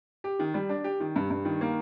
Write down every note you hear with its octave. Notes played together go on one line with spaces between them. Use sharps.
G4
D#3
G3
D4
G4
D#3
G2
G2
D#3
A#3